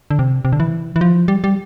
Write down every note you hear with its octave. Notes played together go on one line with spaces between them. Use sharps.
D3
C3
C3
D3
E3
E3
F3
G3
G3